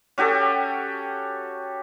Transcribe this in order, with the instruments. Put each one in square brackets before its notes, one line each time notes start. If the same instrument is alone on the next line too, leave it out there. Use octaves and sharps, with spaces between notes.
[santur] C#4 F#4 G4 A4